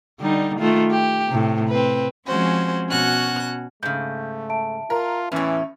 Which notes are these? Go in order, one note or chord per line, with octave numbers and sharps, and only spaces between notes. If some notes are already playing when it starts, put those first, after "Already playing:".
D3 G3 D#4
D#3 A3 F4
G4
A2 C3
C4 B4
F3 G#3 C4 C#4 F#4 C5
B2 C#4 F#4 F#6
G#2 C#3 A3 G6
E5 A5 D7
F4 A#4
E2 A2 E3 C#4